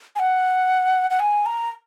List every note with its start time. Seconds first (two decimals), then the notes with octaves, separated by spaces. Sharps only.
0.16 G#5
0.19 F#5
1.10 F#5
1.20 G#5
1.46 A#5